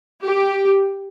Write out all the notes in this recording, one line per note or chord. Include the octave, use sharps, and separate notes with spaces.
G4